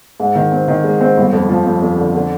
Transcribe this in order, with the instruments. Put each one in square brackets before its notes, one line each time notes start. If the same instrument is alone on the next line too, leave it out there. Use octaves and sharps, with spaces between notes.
[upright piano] G#2
D#3
C4
D#3
G#3
C4
G1
F2
F3
F2
F2
D3
D3